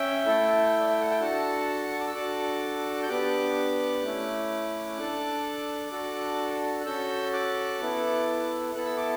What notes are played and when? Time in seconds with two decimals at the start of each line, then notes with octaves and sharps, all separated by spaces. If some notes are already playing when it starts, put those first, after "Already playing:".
Already playing: C#4 E5 G5
0.26 A3 E4 A4
0.80 D5
0.90 E5
1.00 F#5
1.10 G5
1.20 D4 F#4 A4 F#5 A5
1.92 C#6
2.00 D6
2.07 E6
2.14 D4 F#4 A4 D6 F#6
3.03 G6
3.09 B3 D4 G4 D6 F#6
4.03 A3 C#4 E4
4.98 D4 A4
5.92 D4 F#4 A4
6.81 F#6
6.86 C#4 F#4 A4 E6 G6
7.33 D6 F#6
7.81 B3 E4 A4
8.75 B3 E4 A4 F#6
8.86 E6
8.97 D6